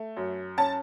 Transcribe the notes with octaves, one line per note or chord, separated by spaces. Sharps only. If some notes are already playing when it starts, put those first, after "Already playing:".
Already playing: A3
F#2
C#4 A5